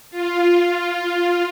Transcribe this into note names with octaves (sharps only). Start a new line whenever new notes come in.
F4